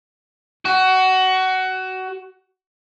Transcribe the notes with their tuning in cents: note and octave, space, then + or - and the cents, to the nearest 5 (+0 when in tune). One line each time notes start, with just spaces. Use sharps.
F#4 +20